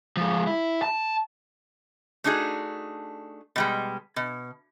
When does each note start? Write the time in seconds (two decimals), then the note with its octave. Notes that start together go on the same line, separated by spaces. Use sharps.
0.17 F3 G#3
0.47 E4
0.82 A5
2.24 A3 D4 D#4 F#4 G#4
3.56 B2 G3 G#3
4.16 B2